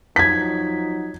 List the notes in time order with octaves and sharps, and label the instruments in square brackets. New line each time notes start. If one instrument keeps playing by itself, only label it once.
[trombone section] F3 F#3 D#4 [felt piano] G#6 B6